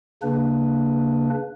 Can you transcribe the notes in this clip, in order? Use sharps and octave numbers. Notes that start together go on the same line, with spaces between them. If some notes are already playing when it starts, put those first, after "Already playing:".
C#3 A#3 D4 B4